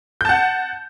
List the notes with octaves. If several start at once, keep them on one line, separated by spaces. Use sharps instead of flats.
F#5 A5 G6